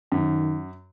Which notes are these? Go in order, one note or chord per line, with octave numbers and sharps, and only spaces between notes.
F#2 D#3